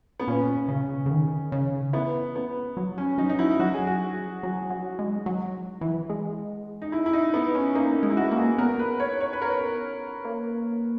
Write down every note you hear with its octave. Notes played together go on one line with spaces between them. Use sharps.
B3
A#2 C#4
C#3
C#3
D#3
C#3
E3 B3
B3
F#3
C#4
F#3 D#4
D#4
F#3 E4
F#3 F#4
G#4
F#4
F#3
F#3
G#3
F#3
E3
G#3
D#4
E4
E4
D#4
B3
C#4
A#3 D#4
G#3
E4
F#4
A#3
G#4
B3 A#4
B4
C#5
C#5
B4
A#4
A#3